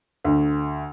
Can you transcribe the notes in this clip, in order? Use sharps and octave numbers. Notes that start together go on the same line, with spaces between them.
D2